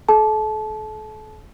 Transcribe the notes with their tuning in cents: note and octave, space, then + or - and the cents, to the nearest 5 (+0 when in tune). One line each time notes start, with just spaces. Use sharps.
A4 -40 A5 -25